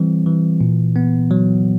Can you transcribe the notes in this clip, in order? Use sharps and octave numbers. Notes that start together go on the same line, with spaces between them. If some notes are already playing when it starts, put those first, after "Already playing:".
Already playing: E3 G3 C4
E3
A#2
B3
F#3